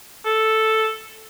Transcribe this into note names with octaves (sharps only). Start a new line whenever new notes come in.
A4